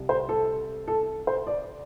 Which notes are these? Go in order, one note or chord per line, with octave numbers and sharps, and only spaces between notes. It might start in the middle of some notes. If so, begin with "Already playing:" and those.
Already playing: C2 C3 G3
C5
A4
A4
C5
D5